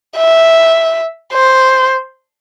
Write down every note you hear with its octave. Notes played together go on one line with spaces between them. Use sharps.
E5
C5